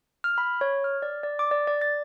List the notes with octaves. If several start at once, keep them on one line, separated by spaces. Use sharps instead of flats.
F6
B5
C#5
F6
D5
D5
D6
D5
D5
A6